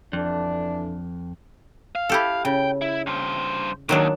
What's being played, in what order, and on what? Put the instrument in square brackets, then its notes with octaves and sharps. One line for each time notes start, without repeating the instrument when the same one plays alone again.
[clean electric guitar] F2 [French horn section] D3 E3 D4
[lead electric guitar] F5
[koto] E4 G4 A4
[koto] C#3 [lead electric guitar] G5
[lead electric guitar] E4
G2 C5
[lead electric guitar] D#2 [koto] D#3 F#3 D4